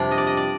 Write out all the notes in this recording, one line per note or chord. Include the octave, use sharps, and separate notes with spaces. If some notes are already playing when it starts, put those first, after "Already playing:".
Already playing: F2 C3 G3 D4
D#5
D5
D#5
D5